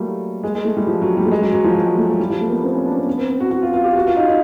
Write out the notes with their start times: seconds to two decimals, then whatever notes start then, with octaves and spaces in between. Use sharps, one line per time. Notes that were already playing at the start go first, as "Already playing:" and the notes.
Already playing: F#3 G3 A3 A#3
0.43 G#3
0.55 G#3
0.65 A3
0.77 G3
0.87 F3
1.02 F#3
1.17 G3
1.25 A3
1.31 G#3
1.42 F#3
1.53 F#3
1.64 F3
1.75 F#3
1.86 G#3
1.98 A3
2.08 G#3
2.20 G3
2.30 F3
2.41 A3
2.47 A#3
2.52 B3
2.63 C4
2.74 C#4
2.86 D4
2.96 C4
3.07 B3
3.18 C4
3.29 C4
3.40 F#4
3.51 F#4
3.62 F4
3.74 F4
3.84 G4
3.96 F#4
4.07 F4
4.17 D#4
4.28 D#4